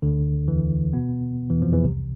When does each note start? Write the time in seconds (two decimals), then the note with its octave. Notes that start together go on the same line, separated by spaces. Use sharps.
0.02 D2 D3
0.47 E2 E3
0.93 B2 B3
1.50 E2 E3
1.62 F2 F3
1.72 E2 E3
1.84 C2 C3